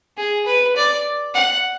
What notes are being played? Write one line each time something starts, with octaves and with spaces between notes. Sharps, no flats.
G#4
B4
D5
F#5